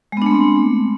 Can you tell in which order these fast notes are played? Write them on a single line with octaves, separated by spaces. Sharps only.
G#3 B3 D4 A3 C4